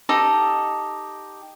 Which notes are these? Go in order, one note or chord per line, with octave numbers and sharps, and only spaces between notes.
D#4 G4 A4 D#5